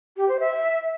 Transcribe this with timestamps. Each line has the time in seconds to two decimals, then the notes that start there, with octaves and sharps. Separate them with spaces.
0.17 G4
0.28 C5
0.40 E5